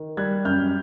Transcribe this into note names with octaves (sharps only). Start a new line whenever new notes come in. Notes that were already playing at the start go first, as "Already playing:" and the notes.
Already playing: D#3
G3 F#6 G#6
F#2 F6 G6